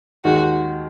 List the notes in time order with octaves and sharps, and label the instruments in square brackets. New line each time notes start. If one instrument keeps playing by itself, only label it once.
[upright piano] D#2 D#3 G#3 [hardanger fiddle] F#4